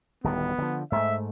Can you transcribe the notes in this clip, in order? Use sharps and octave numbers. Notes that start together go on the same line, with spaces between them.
D1 D#3 G3 B3
D3 F3
G#2 A3 E5